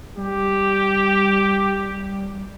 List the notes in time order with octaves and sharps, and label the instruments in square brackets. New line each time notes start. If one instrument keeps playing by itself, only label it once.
[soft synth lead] G3 [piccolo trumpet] G4